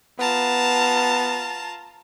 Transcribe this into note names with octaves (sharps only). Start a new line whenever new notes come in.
B3 F4 A5 A#5